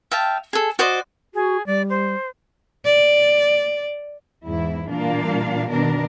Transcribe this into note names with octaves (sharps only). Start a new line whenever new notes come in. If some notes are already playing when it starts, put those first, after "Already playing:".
E5 F5 G5 A5
G#4 A4
F#4 C5 D5 D#5
F#4 G#4
G3 D5
C5
D5
E2 G#2 E4
A#2 E3 G3 A#3 D4 F5
B2 D#3 D4 A#4